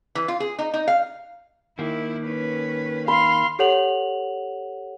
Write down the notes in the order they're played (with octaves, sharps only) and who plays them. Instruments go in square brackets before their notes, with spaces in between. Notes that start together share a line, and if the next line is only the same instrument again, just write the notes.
[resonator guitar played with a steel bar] E3
F4
G#4
D#4
D#4
F5
[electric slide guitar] D#3 A#3 [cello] E4
[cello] C#4 B4
[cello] F5 [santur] B5 [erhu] C6
[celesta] G4 A4 C#5 F#5 F7 F#7